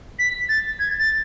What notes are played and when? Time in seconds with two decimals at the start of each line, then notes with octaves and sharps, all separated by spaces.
0.19 B6
0.49 A6
0.79 G#6
1.00 A6